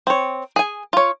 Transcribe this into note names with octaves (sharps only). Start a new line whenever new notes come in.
C4 C#5
G#4 G#5
F4 C#5